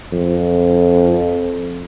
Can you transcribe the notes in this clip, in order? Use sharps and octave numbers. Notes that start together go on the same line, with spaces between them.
F2